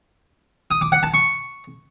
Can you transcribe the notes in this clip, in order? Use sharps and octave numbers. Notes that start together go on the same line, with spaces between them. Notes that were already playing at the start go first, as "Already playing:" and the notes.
D#6
D6
F#5
A5
C#6